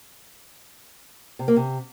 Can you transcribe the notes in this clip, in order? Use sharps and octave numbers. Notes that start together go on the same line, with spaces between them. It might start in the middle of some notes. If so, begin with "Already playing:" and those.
C3
A#3
C3